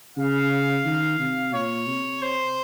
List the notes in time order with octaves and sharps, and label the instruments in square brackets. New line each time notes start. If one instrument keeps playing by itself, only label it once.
[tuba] C#3 [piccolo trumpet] F5
[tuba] D#3
C3
[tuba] A#2 [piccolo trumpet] C#5
[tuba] C3
[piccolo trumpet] C5